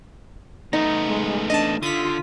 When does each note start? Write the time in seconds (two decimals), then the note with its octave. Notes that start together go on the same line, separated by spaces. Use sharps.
0.73 A3 B3 D#4
1.08 G#3
1.50 D4 D#5 A5
1.83 D3 F4 D#6 B6